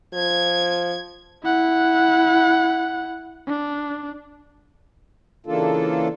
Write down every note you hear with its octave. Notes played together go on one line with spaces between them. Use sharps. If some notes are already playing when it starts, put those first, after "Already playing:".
F3 G#6
E4 F#5
D4
C#3 E3 A#3 D4 F4 A4